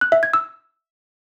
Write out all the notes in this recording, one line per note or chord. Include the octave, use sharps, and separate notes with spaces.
F#6
E5
G#6
E6